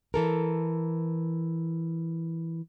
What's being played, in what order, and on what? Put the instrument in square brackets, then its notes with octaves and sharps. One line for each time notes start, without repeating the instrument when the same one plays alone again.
[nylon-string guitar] E3 A4 A#4